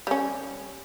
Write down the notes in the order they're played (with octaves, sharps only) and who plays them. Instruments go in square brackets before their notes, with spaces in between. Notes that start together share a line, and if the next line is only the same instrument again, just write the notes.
[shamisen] G3 C#4